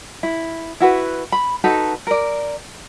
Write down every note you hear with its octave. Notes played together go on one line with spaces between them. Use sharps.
E4
E4 F#4 B4
B5
D#4 F#4 A4 B4
A#4 D5